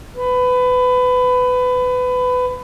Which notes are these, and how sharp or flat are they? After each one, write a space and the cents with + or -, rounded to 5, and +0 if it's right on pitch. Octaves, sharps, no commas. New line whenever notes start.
B4 +25